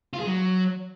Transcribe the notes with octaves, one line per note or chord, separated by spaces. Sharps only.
F4
G#4
F#3